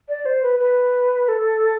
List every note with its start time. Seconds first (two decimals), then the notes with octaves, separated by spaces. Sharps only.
0.09 D5
0.25 C5
0.43 B4
0.59 B4
1.28 A4